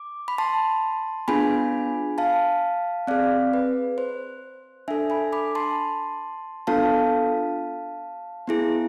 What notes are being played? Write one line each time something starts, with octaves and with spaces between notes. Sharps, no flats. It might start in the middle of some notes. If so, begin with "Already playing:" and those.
Already playing: D6
B5
A5 C6
B3 D4 F4 G#4 G#5 B5
F5 A5
C4 G#4 D5 F5
B4
C5
D4 A4 E5 G#5
G#5 B5
B5 D6
A5 C6
B3 D4 F4 A4 F5 A5
B3 E4 G#4